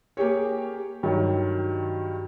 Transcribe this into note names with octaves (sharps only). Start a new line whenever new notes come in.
A#3 G4 G#4 C#5
G2 D#3 F#3